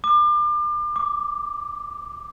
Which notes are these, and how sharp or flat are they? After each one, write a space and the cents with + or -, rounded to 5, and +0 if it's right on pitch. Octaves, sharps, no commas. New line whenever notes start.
D6 +35
D6 -5